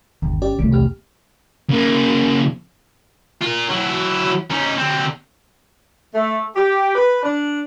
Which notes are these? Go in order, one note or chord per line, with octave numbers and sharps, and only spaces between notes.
G1 D#2
C#4 G4 D5
C2 G3 A3
E2 G4 F6
C#3 A#3
F4 A#4
F#3 E4
C#4 D#4
D3 C4
A3
G4
B4
D4